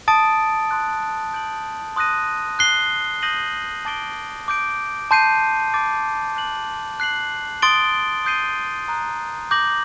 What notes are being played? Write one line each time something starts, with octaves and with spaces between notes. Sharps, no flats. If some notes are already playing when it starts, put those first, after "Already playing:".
A5 D#6 A6 D7
C6 D#6 F#6
G6 D7 F#7
C6 D#6 F#6 A#6 D#7
F#6 C7 G7
D#6 G6 A#6 D#7 F#7
A5 D6 A6 D7 G7
D6 G6 D7
A5 C6 G6 C7 D#7
D6 A6 D7
F#6 C7 F#7
F#6 C7 F#7
C6 D#6 A6 D7 G7
D#6 G6 C7 D#7 G7
A#5 D#6 F#6
D6 G6 A#6 F#7